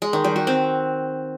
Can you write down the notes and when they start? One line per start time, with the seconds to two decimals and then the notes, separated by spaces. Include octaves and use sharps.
0.02 G#3
0.13 D#3
0.24 G3
0.36 F#4
0.47 C4